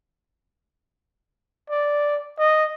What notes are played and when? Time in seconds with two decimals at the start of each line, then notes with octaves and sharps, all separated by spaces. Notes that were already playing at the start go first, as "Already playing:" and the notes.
1.70 D5
2.38 D#5